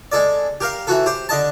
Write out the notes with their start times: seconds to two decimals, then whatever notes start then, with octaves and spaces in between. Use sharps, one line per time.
0.12 G#3 A4 D5
0.61 G4 A#4 F5
0.87 E3 F#4 A4
1.06 G4 C5
1.29 D3 D#5 A5